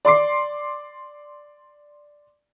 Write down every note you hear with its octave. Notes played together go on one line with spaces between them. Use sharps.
D5 C6 D6 C7